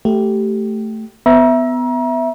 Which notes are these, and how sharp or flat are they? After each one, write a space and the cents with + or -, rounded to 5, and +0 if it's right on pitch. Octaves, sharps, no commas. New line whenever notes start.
A3 +0 G4 -15
B3 +20 E5 +0 A#5 +35